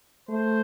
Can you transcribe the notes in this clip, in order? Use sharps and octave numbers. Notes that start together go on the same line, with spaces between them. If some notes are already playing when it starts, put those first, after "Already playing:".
A3 C5